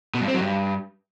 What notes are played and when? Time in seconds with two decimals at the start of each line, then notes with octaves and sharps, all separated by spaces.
0.14 B2
0.21 G2
0.28 C4
0.34 F#3
0.41 G2